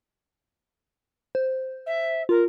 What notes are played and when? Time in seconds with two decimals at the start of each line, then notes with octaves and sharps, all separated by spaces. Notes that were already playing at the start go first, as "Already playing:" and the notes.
1.35 C5
1.86 E5
2.29 F4 A#4